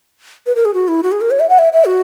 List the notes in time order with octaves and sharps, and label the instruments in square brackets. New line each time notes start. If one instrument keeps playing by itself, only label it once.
[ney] B4
A#4
G#4
F#4
E4
F#4
G#4
A#4
C#5
E5
F#5
E5
E5
F#4